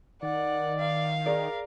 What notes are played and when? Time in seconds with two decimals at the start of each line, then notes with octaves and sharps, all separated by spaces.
0.22 D#3 D5 F#5
0.79 F5
1.26 G#4 A#4 D5